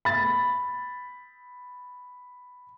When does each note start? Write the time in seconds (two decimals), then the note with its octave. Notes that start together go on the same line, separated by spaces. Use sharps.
0.05 B5 A6